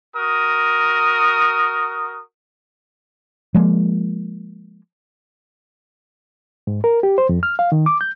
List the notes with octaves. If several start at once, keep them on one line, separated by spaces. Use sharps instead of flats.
F#4 A#4 D#6
F3 G#3 A#3
G#2
A#4
G4
C5
F2
F6
F5
D#3
D6
G6